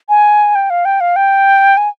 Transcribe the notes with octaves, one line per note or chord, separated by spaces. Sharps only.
G#5
G5
F5
G5
F5
G5
G#5